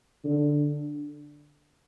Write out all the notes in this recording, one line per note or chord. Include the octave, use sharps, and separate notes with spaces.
D3